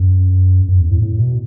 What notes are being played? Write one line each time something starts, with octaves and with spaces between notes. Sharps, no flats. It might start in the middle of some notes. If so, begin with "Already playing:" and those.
Already playing: F#2
F#2
E2
A2
A2
B2